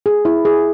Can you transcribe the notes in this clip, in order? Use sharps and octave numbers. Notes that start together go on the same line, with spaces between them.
G#4
E4
G#4